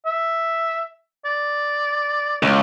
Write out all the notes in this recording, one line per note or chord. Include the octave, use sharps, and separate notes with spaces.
E5
D5
C#2